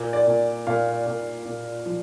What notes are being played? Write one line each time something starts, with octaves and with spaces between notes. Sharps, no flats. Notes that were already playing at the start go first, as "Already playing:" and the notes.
Already playing: A#2
D5
A#2
A#2 F5
A#2
A#2
F3